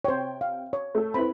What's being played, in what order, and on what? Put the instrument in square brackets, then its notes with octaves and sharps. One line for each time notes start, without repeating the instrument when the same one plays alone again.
[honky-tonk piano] C3 G5 [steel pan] C5 C#5
[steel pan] F5
C#5
[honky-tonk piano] A3 A4
[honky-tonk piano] C4 E4 B4 [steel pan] B5